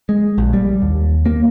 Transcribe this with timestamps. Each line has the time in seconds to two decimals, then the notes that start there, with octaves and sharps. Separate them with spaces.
0.09 G#3
0.38 A#1
0.53 G3
0.82 D#2
1.26 A#3